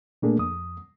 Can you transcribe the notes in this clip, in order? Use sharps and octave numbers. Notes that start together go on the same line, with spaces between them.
A#2 A3 A#3 D4 G#4
F2 D#6